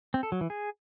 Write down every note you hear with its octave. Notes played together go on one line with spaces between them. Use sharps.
C4
A4
F#3
E3
G#4